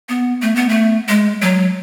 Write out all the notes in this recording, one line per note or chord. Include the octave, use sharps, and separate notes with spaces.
B3
A3
B3
A3
G#3
F#3